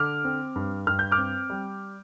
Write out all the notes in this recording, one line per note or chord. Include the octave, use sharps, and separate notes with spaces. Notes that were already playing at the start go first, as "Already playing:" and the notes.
Already playing: D3 D6 F6
C4
G2
G2 F6
G6
D6 F6
C4
G3